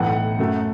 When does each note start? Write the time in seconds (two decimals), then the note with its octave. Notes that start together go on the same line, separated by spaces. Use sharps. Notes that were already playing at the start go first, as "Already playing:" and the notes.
Already playing: B1 A2 E3 B3 F#5
0.39 F#2 F#3 A3